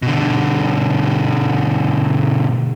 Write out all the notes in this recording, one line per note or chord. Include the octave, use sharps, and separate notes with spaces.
B2 D3